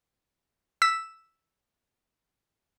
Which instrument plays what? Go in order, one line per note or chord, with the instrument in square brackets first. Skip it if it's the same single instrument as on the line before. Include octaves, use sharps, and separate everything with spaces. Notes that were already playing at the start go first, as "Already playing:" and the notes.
[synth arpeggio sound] E6 B6